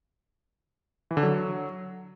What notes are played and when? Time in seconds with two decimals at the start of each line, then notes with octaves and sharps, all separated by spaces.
1.11 E3
1.17 D3
1.23 F#3